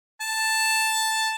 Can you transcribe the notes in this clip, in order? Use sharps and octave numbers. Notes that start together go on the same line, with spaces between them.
A5